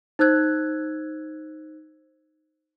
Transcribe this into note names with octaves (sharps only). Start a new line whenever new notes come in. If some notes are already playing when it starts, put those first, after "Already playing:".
D#4 C5 E6 F#6 G#6